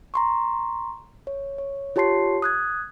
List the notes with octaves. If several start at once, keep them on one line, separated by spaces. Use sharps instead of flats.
A#5 C6 C#6
C#5
C#5
F4 G4 C#5 A5 C6 C7
D#6 F#6 G#6